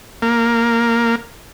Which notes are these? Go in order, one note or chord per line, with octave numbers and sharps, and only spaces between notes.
A#3